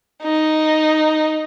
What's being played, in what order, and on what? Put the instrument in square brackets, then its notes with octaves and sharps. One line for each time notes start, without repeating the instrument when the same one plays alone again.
[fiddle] D#4